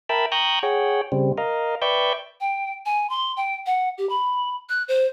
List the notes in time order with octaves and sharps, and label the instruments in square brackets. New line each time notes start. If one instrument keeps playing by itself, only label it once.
[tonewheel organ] A#4 E5 G5 A5 B5
G5 A#5 C#6 D#6 F#6 G6
G#4 C#5 F#5 G5
C#3 G3 C4
A#4 D#5 F5
B4 D5 E5 G5 C#6 G6
[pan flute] G5
G#5
C6
G5
F#5
G4
B5
F#6
C5